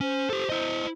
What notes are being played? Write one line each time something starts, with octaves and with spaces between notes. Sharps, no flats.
C#4 C5
G4 A4
E4 D#5